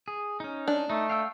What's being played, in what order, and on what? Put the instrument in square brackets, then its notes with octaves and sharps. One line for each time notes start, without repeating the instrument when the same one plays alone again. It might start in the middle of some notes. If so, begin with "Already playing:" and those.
[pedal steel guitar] G#4
C#4 D#4
[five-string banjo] D4
[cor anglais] A3 [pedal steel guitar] D#4
[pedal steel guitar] F5 G5 E6